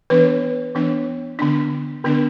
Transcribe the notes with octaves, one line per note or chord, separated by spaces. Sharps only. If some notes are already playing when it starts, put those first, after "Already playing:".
E3 B3 D4 B4
E3 B3 D4
D3 B3 D4
D3 B3 D4